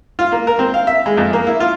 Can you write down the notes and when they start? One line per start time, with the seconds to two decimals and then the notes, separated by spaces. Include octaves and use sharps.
0.19 F4
0.32 A#3
0.47 A#4
0.59 C4
0.74 F5
0.87 E5
1.06 G#3
1.17 F2
1.33 A#3
1.47 E4
1.60 F4